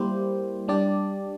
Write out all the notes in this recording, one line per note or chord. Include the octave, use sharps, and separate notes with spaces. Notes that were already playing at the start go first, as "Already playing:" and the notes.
Already playing: G3 A#3 E4 G4 C5
G3 D4 G4 D5